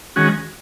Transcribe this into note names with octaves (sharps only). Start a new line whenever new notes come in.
D#3 G#3 C#4 F#4